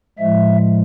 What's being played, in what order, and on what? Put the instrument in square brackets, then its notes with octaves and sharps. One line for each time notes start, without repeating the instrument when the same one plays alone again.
[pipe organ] A2 F3 G#3 E5